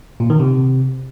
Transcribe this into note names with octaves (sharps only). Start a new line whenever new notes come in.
A#2
D#3
C3